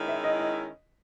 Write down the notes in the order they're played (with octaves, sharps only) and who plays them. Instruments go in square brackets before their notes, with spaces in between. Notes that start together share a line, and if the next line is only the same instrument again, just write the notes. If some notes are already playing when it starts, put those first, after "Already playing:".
Already playing: [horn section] D#3 G#3 C#4 E4
[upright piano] E5
D#5
D#5